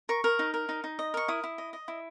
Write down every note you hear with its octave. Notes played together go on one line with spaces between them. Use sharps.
A#4 C#6
A#4
D#4
A#4
D#4
D#4
D#5
A#4 C#6
E4 D#6
E4
D#5
D#5
E4